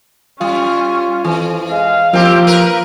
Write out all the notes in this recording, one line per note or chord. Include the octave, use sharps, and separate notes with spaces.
G3 C#4 F4
F2 E3
G#3 F5
F3 A#3 C4 G4
A#4 B4